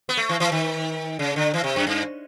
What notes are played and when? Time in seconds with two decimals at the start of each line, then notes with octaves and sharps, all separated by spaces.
0.09 B3
0.17 A3
0.29 E3
0.40 E3
0.52 D#3
1.19 C#3
1.36 D3
1.54 E3
1.64 C3
1.76 F#2
1.87 G2